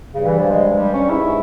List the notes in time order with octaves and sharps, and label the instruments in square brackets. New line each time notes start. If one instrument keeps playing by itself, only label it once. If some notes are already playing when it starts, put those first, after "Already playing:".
[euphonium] G2 [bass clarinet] C#3
[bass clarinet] E3
F3
G#3
G3
C#4
[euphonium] G#2 [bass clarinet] E4